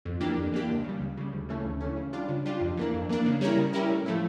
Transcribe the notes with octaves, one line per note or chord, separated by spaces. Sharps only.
F2
E3 A#3 D4 G4
F2
E3 A#3 D4 G4
C#2
C#3 G3
C#2
C#3 G3
D2
C#3 E3 A3 C#4
D2
C#3 E3 A3 C#4
C#3
G3 D4 F4
C#3
G3 D4 F4
F2
E3 A#3 D4
F2
E3 A#3 D4
C#3
G3 C#4 E4 A#4
C#3
G3 C#4 E4 A#4
A2
F3 A3 E4